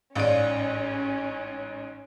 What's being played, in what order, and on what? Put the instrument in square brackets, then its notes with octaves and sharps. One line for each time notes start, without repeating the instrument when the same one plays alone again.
[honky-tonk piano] A1 G#2 [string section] C#4 [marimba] D5 F5